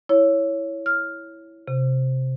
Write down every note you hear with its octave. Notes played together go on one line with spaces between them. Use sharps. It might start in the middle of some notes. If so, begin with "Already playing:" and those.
E4 C#5
F6
C3